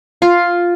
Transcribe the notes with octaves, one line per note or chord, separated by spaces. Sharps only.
F4